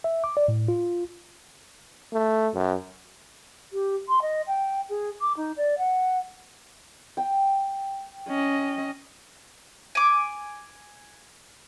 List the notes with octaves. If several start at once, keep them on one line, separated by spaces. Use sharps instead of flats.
E5
D6
D5
A2
F4
A3
F#2
G4
C6
D#5
G5
G#4
D6
D#4
D5
F#5
G5
C#4 D#5
G#5 D6